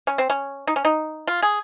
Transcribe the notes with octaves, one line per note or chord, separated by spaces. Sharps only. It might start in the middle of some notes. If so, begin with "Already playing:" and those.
C#4
C4
C#4
D#4
C#4
D#4
F4
G#4